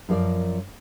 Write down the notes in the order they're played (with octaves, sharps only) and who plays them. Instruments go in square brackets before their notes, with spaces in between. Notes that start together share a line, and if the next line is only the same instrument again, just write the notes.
[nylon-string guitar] F#2 F3 A#4 D5